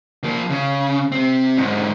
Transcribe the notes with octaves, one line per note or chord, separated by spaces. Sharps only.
F3 A#3
C#3
C3 C4
E2 G#2